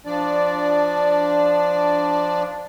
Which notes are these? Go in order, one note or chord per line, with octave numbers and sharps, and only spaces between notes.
F3 D4 D5